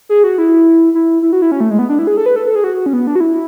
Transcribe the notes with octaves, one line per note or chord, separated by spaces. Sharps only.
G#4
F#4
E4
E4
E4
F#4
E4
C#4
A3
G#3
B3
D4
E4
G#4
A4
B4
A4
A4
G#4
F#4
C#4
B3
D4
F#4
E4